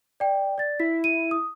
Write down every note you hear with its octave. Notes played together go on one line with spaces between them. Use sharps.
D5 G5
D5 A6
E4 B6
D#7
D#6